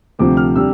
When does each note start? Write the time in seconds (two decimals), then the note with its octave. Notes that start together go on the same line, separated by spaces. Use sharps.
0.19 D2 C3 F3 C4 D6
0.37 F6
0.56 C3 G3 D4 E6